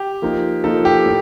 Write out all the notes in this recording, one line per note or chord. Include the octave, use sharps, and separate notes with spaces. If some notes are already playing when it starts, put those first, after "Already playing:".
Already playing: G4
F3 A#3 D#4
F3 A#3 D#4 A4
G4
A2